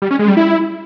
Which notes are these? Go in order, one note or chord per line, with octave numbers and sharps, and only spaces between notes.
G3
C#4
G#3
G3
E4